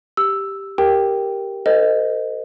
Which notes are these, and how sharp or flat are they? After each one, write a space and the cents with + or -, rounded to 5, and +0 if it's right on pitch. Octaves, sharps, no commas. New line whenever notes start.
G4 +0 E6 +0
G4 +0 A#4 +0 G5 +0
A4 +45 C5 -30 D#5 +0